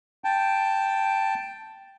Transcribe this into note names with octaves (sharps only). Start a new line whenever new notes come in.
G5 A5